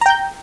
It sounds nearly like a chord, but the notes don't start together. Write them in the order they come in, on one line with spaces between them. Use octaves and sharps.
A#5 G5 G6